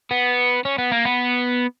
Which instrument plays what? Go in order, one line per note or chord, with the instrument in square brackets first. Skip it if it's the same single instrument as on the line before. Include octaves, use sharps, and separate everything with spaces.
[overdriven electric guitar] B3
C#4
B3
A#3
B3